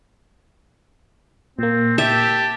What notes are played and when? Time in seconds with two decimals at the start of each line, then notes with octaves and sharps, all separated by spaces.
1.59 A#2 A#3 C4
1.98 G4 E5 A5